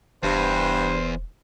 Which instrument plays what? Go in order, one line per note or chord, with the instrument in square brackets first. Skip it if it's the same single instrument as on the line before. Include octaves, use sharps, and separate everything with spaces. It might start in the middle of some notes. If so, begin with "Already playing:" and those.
[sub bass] E1 [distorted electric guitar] E2 [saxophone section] G2 [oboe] C5